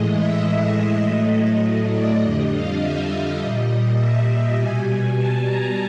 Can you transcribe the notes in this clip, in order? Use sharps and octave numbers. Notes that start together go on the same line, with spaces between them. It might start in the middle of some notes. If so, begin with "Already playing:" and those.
Already playing: A2 E3 G#3 D#5
E5
D#5
A2 F#3 A3
D#5
D#5
D5
F2 D3 G3 D#5
F5
E5
D#5
A#2 G3
E5
B2 G3 G#5
A5
A#5